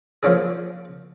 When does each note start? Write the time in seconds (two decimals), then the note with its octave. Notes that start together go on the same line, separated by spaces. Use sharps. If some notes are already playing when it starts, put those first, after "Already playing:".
0.23 F3 A#3 C#4 D4 G#4